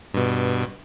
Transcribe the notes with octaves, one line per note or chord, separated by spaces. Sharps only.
G2 B2